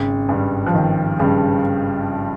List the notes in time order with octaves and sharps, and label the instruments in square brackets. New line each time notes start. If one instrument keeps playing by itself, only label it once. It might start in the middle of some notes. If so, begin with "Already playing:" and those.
Already playing: [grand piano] G#1 [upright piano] C#3
[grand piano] G2 G3
[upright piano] F3
[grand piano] G#1 [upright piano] D#3
[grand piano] G2 G3 [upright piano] C#3